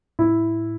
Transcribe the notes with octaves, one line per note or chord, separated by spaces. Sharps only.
A2 E4